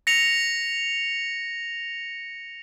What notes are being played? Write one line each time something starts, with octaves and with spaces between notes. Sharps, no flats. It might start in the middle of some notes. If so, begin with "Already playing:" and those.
A#6 C#7 F7